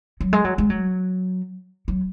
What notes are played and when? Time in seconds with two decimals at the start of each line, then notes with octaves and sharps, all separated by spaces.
0.21 F#3
0.33 G#3
0.45 F#3
0.58 G#3
0.70 F#3
1.88 F#3